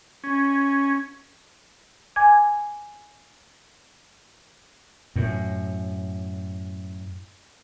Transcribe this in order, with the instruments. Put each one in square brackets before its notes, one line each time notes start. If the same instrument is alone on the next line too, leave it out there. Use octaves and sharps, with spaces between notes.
[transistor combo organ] C#4
[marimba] G#5 D6 G#6
[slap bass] F#2 A2